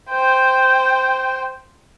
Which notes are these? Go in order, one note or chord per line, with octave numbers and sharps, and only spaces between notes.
C5 G5